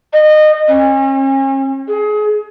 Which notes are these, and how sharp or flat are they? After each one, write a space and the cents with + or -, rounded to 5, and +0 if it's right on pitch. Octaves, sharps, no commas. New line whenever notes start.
D#5 -25
C#4 -40
G#4 +30